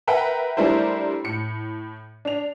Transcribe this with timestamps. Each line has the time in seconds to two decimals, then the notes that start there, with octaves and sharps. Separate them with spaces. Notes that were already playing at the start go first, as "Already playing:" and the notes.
0.07 A#4 B4 E5 F#5 G5
0.57 G3 A3 D4 E4 A#4 C5
1.24 A2 C#7
2.25 D4 F7